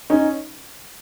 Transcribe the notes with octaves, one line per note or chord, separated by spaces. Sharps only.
C#4 D#4